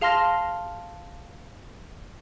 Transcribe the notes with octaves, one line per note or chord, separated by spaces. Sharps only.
G#4 F5 A5 C6 F6 A#6